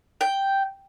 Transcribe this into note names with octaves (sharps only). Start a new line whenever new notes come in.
G5